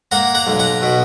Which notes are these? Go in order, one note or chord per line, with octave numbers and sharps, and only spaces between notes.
A#3 F#5 A#5
F#5 A#5
B1
F#5 A#5
B2